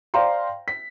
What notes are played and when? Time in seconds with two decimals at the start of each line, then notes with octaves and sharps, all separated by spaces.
0.14 C5 D5 F5 G5 A#5 C6
0.68 B6